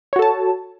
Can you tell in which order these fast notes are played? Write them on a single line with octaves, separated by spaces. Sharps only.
C#5 F#4 A4 A5